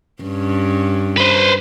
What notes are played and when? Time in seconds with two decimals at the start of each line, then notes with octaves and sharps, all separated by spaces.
0.23 G2 C#4
1.17 B4 C5